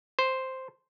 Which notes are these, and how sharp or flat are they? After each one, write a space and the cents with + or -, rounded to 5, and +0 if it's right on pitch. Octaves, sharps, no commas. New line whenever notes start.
C5 +0